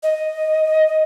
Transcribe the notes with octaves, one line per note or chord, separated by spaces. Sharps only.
D#5